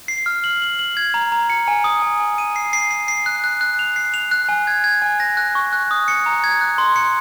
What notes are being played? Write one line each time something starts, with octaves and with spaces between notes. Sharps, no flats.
C7
F6
F#7
F#7
F#7
G#6
A#5
A#5
C#7
G#5
D#6
G#5
G#5
D#7
C7
C7
C7
C7
F#6
F#6
F#6
F7
C7
F7
F#6
G#5
G#6
G#6
G#5
A#6
F#6
C#6
F#6
D#6
C#7
A#5
G#6
F#6
C6
C#7